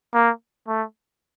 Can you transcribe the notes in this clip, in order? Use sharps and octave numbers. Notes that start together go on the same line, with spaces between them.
A#3
A3